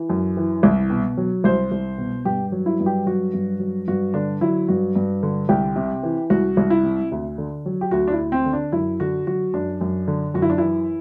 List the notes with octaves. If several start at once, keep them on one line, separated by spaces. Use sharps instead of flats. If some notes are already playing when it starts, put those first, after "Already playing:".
Already playing: E3
F#2
E3
C2
B2
F#3
C2 C5
C2
B2
G2 G4
F#3
E4
G2
G4
F#3 F#4
G2
F#3
G2 F#4
D3 D4
F#3 E4
G2 F#4
G2
D3
C2 G4
C3
E3
C2 F#4
C2
E4
C3
D2
D3
F#3
G4
D2 F#4
D4
E4
D2
C4
D3
D4
F#2 E4
D3 F#4
F#3 F#4
F#2 D4
F#2
D3
F#2 F#4
E4
D4
E3 E4